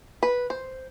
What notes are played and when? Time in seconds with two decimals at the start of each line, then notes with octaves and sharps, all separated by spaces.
0.23 B4
0.50 C5